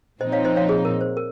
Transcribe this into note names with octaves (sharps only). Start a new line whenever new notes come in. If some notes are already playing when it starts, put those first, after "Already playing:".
A#2 F3 C4 D#4 C5 D#5
C#5 F5
C5 D#5
C#5 F5
G#4
A#4
C5
A#4